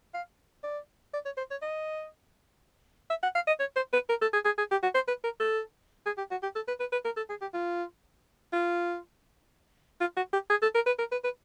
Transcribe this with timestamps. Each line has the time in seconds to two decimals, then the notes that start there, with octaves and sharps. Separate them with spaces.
0.14 F5
0.63 D5
1.14 D5
1.25 C#5
1.37 C5
1.51 C#5
1.62 D#5
3.10 E5
3.23 F#5
3.35 F5
3.47 D#5
3.60 C#5
3.76 C5
3.93 B4
4.09 A#4
4.21 A4
4.33 G#4
4.45 G#4
4.58 G#4
4.71 G4
4.83 F#4
4.94 C5
5.08 B4
5.24 A#4
5.40 A4
6.06 G#4
6.18 G4
6.31 F#4
6.43 G4
6.55 A4
6.68 B4
6.80 B4
6.92 B4
7.05 A#4
7.17 A4
7.29 G#4
7.41 G4
7.54 F4
8.53 F4
10.01 F4
10.16 F#4
10.33 G4
10.50 G#4
10.62 A4
10.74 A#4
10.86 B4
10.99 A#4
11.12 B4
11.24 B4